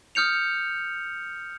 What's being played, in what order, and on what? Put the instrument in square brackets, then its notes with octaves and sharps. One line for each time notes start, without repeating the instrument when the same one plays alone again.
[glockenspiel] D#6 F6 G6 C#7 F7